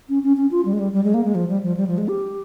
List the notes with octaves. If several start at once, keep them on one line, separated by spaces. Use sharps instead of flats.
C#4
C#4
C#4
F4
G3
G#3
G3
G3
G#3
A#3
G#3
F3
G3
F3
G3
F3
G#3
G4